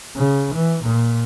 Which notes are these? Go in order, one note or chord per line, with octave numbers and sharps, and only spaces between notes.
C#3
E3
A#2